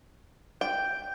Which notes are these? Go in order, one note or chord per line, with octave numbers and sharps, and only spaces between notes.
G5 G6